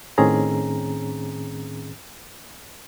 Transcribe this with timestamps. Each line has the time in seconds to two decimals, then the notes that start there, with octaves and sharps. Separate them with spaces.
0.18 A2 D#3 C4 C#4 G#4 A#5